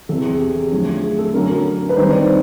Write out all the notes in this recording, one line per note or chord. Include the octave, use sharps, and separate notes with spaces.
E2 C3 E3 A4
G#4
G4
G#4
F#2 D3 F3 A3
G#4
A4
F#2 D3 F#3 A#4
A#4
B4
G2 D#3 G3 C4 D#4 C5
D5